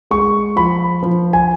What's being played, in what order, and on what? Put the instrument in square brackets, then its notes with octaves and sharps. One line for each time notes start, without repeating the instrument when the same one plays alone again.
[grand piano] G#3 C#6
F3 B5
F3
G#5